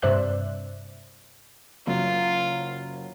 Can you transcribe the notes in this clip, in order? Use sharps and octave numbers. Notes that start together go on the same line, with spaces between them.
G2 C3 C5 D5 E5 F#6
F#1 F#3 F4